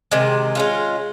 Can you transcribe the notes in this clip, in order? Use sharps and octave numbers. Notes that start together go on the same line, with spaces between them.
C3 D#3 G#3
G#3 C#4 F4